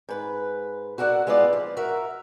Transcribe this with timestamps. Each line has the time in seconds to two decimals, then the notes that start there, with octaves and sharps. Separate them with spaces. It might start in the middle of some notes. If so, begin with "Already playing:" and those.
0.09 G#2 B4
0.98 F#4 A4 A#4 D5 F#5
1.27 G#3 B3 E4 F4 D5
1.53 F3
1.77 F#4 A#4 E5